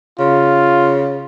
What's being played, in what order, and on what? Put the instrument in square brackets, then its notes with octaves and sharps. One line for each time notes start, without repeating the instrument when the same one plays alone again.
[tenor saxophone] C#3 [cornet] F4